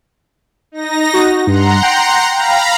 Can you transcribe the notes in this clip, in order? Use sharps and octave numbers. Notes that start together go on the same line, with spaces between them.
D#4 A#6
F#4
G2 F#5 A#5 C6
G5
F5 A#5 B5